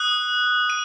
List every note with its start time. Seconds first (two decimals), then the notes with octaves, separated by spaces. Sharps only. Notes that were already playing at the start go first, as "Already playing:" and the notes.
Already playing: D#6 F#6
0.70 D#7